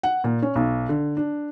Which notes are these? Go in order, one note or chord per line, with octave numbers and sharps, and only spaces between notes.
F#5
A#2
C#4
B1
D3
D4